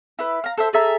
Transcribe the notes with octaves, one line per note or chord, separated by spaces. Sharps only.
E4 B4
F5 A#5
A4 C5 E5
G#4 A4 E5 A#5